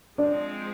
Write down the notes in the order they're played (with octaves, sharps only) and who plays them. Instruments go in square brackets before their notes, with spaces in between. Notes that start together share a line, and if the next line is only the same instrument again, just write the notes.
[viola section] F3 G#3 C4 [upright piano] D4 D5